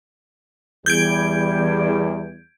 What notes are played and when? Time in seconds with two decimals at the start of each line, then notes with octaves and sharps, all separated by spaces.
0.86 E2 G3 G6 G#6 D7